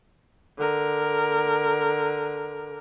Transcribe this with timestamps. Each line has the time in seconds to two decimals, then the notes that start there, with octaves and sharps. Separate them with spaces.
0.58 D3 A#4